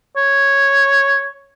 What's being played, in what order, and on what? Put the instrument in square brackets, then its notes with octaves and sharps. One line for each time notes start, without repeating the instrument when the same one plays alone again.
[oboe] C#5